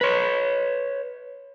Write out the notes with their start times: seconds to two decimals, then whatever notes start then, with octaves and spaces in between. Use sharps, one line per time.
0.01 B4 C#5